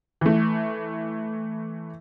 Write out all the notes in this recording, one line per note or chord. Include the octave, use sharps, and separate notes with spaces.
E3 A3